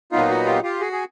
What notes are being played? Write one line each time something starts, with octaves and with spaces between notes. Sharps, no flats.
A#2 F#3 B3 D#4 F4
F#4
F4 G4
F4 G4
F#4 G#4
G#4